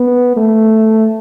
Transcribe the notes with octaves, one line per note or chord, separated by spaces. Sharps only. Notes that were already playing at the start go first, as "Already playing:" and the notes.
Already playing: B3
A3